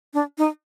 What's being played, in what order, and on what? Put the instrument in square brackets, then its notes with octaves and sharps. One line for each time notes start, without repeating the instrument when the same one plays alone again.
[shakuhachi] D4
D#4